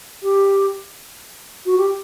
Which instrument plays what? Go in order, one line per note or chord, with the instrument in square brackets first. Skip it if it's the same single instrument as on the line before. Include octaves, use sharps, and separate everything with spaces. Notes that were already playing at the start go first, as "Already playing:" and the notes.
[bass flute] G4
F#4
G4